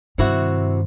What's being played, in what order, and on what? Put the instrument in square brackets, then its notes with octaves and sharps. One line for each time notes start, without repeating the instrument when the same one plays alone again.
[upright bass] G2 D#3 [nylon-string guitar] C3 E4 F#4